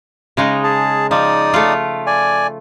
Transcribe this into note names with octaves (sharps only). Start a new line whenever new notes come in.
C#3 G#3 D#4
G#4 A5
F3 D#4 D5 D#6
A3 F4
D5 G#5